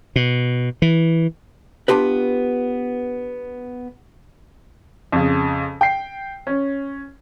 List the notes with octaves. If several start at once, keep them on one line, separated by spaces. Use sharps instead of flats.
B2
E3
B3 D4 F4 G4 B4
F2 C#3
G5 C7
C#4